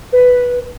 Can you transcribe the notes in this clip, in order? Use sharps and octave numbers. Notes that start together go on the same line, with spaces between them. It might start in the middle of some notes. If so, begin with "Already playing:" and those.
B4